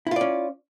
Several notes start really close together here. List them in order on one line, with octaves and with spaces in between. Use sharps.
E4 F4 D5 C#4